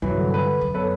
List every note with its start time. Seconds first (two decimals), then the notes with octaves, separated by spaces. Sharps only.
0.02 G2 C3 E3 F#3
0.16 D3
0.34 B4
0.61 F#2
0.74 B3 A4 B4 C#5